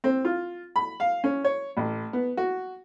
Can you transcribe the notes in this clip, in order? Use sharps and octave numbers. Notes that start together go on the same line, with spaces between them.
C4
F4
B5
F5
C#4
C#5
A1
B3
F#4